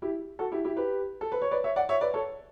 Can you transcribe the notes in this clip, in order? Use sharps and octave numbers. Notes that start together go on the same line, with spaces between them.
E4 G4
F#4 A4
E4 G4
E4 G4
G4 B4
A4
B4
C#5
B4 D5
C#5 E5
D5 F#5
C#5 E5
B4 D5
A4 C#5